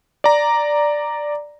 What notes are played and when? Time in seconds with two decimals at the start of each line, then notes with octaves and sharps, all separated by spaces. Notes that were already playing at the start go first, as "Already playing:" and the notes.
0.24 D5 A#5